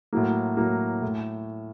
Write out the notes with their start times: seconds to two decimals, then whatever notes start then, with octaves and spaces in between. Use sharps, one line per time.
0.13 A2 F#3 A#3
0.57 A2 F#3 A#3
1.02 A2